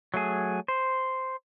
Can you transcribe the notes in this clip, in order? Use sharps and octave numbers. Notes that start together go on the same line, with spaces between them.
F#3 A3 G#4
C5